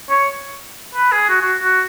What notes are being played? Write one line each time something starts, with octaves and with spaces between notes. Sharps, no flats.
C#5
B4
G#4
F#4
F#4
F#4